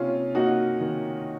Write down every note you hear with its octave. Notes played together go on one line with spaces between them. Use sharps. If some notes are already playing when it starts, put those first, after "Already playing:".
Already playing: C3 A#3 C4 C#4 D#4 F4
A#3 D#4 F#4
D#3